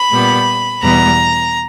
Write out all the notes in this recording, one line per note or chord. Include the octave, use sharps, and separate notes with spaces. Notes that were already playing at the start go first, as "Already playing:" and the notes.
Already playing: B5
A#2 G3 B3
E2 B2 G3 B3 A#5